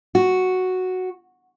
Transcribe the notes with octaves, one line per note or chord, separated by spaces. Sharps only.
F#4